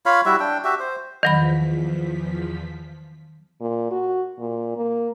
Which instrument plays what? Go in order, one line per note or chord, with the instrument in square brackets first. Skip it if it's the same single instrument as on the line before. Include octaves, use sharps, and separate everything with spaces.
[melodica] F4 C#5 F5 B5
G3 E4 F#4 E5
D4 G5
F#4 G4 E5
C5
[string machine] E2 F3 B6 [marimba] D#3 F#3 B5
[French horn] A#2
F#4
A#2
A#3